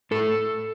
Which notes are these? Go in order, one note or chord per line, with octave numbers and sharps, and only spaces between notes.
A2 A4